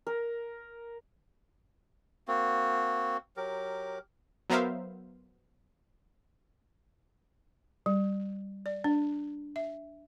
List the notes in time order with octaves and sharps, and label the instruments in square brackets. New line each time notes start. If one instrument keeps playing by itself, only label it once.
[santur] A#4
[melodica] A#3 C4 F#4
F#3 G4 A#4
[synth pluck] F#3 B3 A#4 C5 E5 F5
[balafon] G3
D5
D4
E5